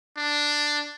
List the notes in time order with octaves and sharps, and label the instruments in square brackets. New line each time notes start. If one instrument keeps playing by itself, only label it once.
[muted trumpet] D4